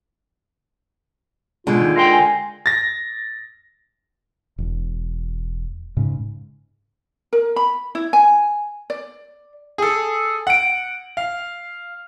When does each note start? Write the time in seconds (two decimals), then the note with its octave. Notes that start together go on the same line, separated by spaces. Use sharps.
1.67 B2 D3 G#3 F4
1.81 D#2 D#4
1.96 A#4 F5 G5 C6
2.11 G#5
2.66 A6 A#6
4.58 E1
5.97 G#2 C#3
7.33 A#4
7.56 B5
7.95 E4
8.13 G#5
8.90 D5
9.78 G#4 A4
10.47 F#5 D7
11.17 F5